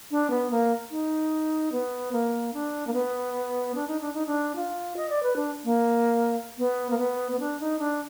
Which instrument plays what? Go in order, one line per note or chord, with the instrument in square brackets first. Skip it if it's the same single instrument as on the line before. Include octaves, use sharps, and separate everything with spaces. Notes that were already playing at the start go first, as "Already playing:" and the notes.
[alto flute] D4
B3
A#3
D#4
B3
A#3
D4
A#3
B3
D4
D#4
D4
D#4
D4
F4
D#5
D5
B4
D4
A#3
B3
A#3
B3
B3
D4
D#4
D4